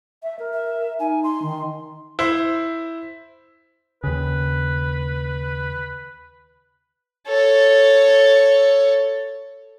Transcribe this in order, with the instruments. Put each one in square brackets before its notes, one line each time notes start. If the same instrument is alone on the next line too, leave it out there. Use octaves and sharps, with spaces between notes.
[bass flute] E5
A#4
[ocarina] E5
[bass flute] D#4 [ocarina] G#5
[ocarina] C6
[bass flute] D#3
[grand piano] E4 C5
[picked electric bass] D#2 C#3 [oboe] B4
[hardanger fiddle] A4 C#5